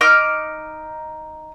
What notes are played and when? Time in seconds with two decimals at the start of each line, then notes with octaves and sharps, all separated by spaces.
0.01 D#4 D6 F6